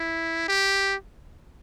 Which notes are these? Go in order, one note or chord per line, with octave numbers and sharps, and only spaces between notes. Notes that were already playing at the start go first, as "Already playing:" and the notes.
Already playing: E4
G4